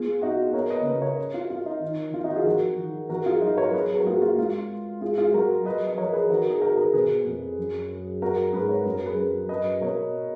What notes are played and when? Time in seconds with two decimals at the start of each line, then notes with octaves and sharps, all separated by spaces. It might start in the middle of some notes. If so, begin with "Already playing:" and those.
Already playing: B3 F4 G#4
0.22 D#4 F#4
0.54 B3 A#4 C#5
0.70 B4 D#5
0.86 C#3 B4 D#5
1.02 A#4 C#5
1.34 F4
1.50 F4
1.66 D#4
1.82 D#3
2.14 D#3 F4
2.24 D#4 F#4
2.35 F4 G#4
2.46 F3 F#4 A#4
2.78 D#3
3.09 F3 F#4 A#4
3.26 F4 G#4
3.42 F#3 D#4 F#4
3.54 B4
3.57 A#4 C#5
3.73 F#3 G#4 B4
3.85 G#4 B4
3.95 F#4 A#4
4.06 A#3 F4 G#4
4.15 F#4
4.22 F4
4.38 G#3 F4
5.01 F4 G#4
5.18 F4 G#4
5.34 F#3 F#4 A#4
5.66 F#3 B4 D#5
5.87 D#5
5.98 F3 A#4 C#5
6.13 G#4 B4
6.30 D#3 F#4 A#4
6.50 G#4
6.61 F#4 A#4
6.72 A#4
6.78 G#4 B4
6.93 B2 G#4 B4
7.26 F2
7.58 F#2
8.22 F#4 A#4
8.53 G#2 G#4 B4
8.69 C#5
8.82 F#2 B4
8.94 A#4
9.06 G#4 B4
9.18 F#2
9.49 F#2 B4 D#5
9.81 B2 A#4 C#5